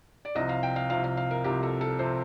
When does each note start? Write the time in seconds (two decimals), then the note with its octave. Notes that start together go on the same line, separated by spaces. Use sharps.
0.25 D5
0.35 C2 C3 F3 D#5
0.49 F5
0.63 G5
0.76 F5
0.90 C2 C3 F3 F5
1.04 F5
1.17 F5
1.31 A#4
1.44 C2 C3 F3 G4
1.63 A4
1.81 A4
1.99 C3 F3 C5